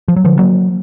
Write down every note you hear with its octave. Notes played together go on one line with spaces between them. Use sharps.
F3
F#3
D3 F3
F#3 A#3